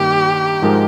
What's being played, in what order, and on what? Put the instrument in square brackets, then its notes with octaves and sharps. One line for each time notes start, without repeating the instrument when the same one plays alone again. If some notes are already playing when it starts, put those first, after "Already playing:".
Already playing: [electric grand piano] G2 D#3 A#3 [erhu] G4
[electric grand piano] G#2 F3 G#3 D#4 A#4